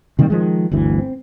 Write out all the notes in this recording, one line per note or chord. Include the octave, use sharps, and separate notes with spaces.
C3 D#3 G3 A#3
D#3 F3 G#3
G1 D2 E3
C4